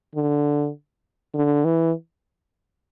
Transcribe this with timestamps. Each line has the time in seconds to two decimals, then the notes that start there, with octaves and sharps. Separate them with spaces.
0.15 D3
1.35 D3
1.65 E3